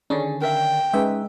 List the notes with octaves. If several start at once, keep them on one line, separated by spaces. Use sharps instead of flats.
D3 D#3 C#4 D4 G#4 G#5
A#4 E5 F5 G5
G#3 C#4 D#4 B4 E5